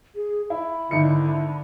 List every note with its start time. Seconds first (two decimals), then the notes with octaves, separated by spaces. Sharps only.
0.16 G#4
0.50 E4 B5
0.91 G#1 D3 D#4 E4 C#7